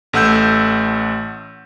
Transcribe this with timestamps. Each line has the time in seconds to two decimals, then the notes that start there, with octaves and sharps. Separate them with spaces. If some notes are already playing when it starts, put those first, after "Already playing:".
0.13 A1 A3 F#5 E6 G6